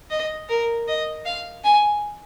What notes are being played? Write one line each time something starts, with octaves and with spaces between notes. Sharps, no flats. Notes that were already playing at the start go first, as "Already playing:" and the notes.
D#5
A#4
D#5
F5
G#5